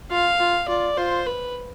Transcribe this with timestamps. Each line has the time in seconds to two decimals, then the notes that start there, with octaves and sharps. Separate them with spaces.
0.11 F4 F5
0.40 F4
0.68 F4 D5
0.97 F4 C5
1.26 B4